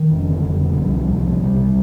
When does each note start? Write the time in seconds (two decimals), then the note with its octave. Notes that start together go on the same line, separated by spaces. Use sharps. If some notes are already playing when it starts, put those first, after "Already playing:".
Already playing: D#3
0.10 F1
0.27 D3
0.43 F1
0.60 D3
0.77 C2 F3
0.86 G3
0.93 C3 F3
1.04 G3
1.09 C2 F3
1.26 C3
1.43 C2 G3
1.59 C3